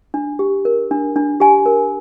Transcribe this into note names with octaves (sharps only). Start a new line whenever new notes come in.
D4
G4
A#4
D4
D4
G4 G#5
A#4